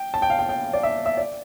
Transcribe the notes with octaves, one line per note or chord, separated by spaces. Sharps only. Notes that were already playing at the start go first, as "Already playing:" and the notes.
Already playing: G5
A5
G5
F5
G5
G5
D5
E5
E5
D5